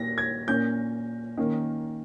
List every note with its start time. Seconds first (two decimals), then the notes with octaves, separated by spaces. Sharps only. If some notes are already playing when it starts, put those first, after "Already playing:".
Already playing: A#2 A#3 A#6
0.18 G#6
0.48 A#2 A#3 C#4 G6
1.38 D#3 A#3 C#4